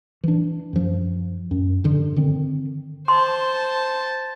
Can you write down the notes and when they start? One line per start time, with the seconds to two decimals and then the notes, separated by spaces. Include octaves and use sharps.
0.23 E3 D4
0.73 F#2 F3
1.51 F#2
1.84 G2 D3
2.16 D3 D#3 C4
3.08 C5 A5 C6